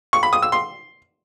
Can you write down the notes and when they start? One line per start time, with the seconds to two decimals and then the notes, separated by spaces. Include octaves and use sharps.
0.13 C#6
0.23 B5
0.33 D#6
0.42 E6
0.52 C6